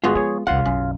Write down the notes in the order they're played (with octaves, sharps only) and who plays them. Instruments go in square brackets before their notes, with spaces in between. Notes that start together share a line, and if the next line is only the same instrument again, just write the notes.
[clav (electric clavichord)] G1 F#4 [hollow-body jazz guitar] G#3 B3 F4
[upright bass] F3 C#4 [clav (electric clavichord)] G#4 C#5
[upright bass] D#1 C2 [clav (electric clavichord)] C#3 F4 F5 [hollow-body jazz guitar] F#5
[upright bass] B1 E4 [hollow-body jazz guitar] F#2